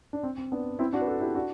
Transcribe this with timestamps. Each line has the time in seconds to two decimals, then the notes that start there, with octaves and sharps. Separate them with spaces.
0.13 D4
0.23 C4
0.38 C4
0.52 B3 D4
0.79 C4 E4
0.93 D4 F#4
1.02 B4
1.07 F#4 A4
1.21 E4 G4
1.35 D4 F#4